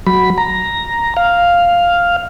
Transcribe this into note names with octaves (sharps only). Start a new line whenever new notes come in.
F#3 B5
A#5
F5